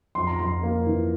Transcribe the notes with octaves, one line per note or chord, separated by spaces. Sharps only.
F2 C6
A#5
F2 C6
A#3
E3